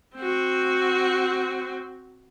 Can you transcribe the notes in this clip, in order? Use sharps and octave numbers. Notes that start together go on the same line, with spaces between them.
C4 F#4